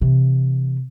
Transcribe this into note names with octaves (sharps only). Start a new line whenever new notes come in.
C3 E3